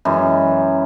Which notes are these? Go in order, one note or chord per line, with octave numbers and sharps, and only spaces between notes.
F#2 E3 G#3